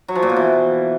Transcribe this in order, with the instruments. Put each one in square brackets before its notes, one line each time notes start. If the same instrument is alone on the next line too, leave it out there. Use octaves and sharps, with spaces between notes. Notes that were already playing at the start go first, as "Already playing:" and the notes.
[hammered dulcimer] F#3
F3
A#2
B2
E3